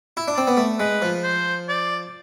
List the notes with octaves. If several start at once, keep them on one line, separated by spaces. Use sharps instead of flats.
E4
D4
C4 D5
B3
A3
G#3 B4
F3
C5
D5